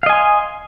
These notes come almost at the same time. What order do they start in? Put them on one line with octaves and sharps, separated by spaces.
F5 D#5 G#5 C6